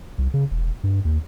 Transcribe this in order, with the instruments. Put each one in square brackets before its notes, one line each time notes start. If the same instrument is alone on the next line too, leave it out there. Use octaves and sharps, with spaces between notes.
[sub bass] C2
C#3
E1
G2
D#2